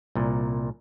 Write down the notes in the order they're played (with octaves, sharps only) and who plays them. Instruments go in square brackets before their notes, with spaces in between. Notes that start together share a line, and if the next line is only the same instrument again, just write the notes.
[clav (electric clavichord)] C2 A#2